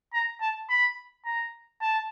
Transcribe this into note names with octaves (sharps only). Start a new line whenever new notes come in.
A#5
A5
B5
A#5
A5